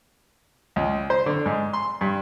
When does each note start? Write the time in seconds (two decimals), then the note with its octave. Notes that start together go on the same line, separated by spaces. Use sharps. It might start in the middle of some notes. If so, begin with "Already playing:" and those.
0.76 C#2
1.10 C5
1.26 D3
1.46 G#2
1.73 C6
2.01 G2